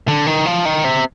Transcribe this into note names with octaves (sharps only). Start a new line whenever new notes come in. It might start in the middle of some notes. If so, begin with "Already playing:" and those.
D3
D#3
F3
D#3
C3